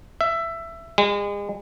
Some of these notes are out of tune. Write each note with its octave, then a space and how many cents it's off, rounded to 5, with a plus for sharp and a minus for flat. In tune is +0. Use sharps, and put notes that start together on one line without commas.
E5 +15
G#3 -35